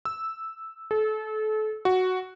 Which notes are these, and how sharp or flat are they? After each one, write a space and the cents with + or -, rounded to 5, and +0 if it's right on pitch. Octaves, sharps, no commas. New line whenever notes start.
E6 -5
A4 -30
F#4 +0